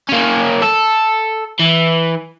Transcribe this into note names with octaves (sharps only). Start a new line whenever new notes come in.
A#3 C#4
A4
E3